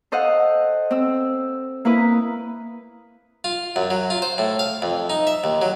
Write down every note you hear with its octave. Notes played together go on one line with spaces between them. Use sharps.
A4 C5 D#5 F5 F#5
C4 E6
A#3 E4 B4 D#6
F4
F#2
F#3
F4
C5
A2
F5
F2
D#4
E5
D#2
F#3